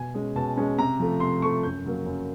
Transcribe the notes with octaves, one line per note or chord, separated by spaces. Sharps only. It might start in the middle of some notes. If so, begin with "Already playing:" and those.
Already playing: B2 G#5
G#3 C#4
B2 A5
G#3 C#4
C3 A#5
F3 A3
C3 C6
F3 A3 C#6
F#2 G6
C#3 F#3 A#3
F#2